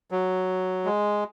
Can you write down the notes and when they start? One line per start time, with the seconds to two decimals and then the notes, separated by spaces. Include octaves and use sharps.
0.11 F#3
0.85 G#3